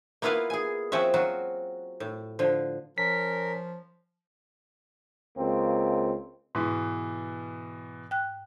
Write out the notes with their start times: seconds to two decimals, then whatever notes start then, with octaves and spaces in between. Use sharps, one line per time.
0.22 A#3 B3 E4 F4 B4 F5
0.50 G#4 G#5
0.92 F3 C4 C#4 F#4 E5
1.14 F#3 F4 F#4
2.00 A2
2.39 D3 F3
2.98 F3 C#4 A#4 B6
5.37 C#2 A#3 C4
6.55 G#2 B2 E3
8.11 G5 F#6